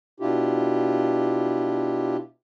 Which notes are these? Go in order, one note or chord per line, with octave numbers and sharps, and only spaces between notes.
B2 D4 E4 F4 G4